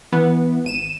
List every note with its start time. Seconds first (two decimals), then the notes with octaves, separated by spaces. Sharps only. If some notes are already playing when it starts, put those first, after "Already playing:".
0.12 E3 B3
0.65 G#1 D#7 E7